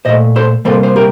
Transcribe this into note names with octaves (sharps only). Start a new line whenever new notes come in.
A#2 A3 C5 D#5
A4 C5
C3 G3 A#3 A4 C5
C5
G4 A#4